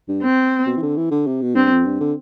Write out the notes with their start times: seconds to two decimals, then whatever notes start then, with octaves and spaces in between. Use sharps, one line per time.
0.08 G2
0.23 C4
0.67 B2
0.77 E3
0.83 D3
0.97 E3
1.11 D3
1.27 C3
1.42 B2
1.56 G2 C4
1.72 F2
1.85 G2
2.00 D3